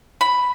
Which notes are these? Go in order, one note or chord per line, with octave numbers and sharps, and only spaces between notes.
B5